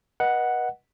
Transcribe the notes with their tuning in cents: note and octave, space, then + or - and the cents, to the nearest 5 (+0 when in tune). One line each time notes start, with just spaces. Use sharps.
B4 -35 D#5 +0 F#5 +0